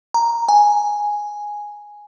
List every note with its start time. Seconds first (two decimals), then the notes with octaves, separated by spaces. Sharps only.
0.14 A#5
0.49 G#5